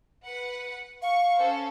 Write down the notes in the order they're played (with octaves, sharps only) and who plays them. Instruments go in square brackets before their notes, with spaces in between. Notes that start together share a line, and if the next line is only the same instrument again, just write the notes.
[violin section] B4 F#5
[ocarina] F5 [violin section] C#6
[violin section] C#4 A4 C5